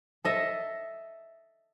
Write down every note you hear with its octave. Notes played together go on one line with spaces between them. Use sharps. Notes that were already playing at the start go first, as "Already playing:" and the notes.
A4 D#5 E5